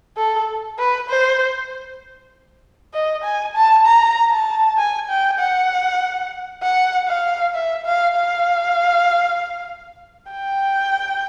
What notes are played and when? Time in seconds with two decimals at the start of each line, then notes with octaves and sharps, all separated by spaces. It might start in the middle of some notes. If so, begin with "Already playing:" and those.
0.17 A4
0.79 B4
1.09 C5
2.94 D#5
3.24 G#5
3.55 A5
3.86 A#5
4.31 A5
4.78 G#5
5.09 G5
5.39 F#5
6.63 F#5
7.08 F5
7.55 E5
7.86 F5
8.16 F5
10.31 G5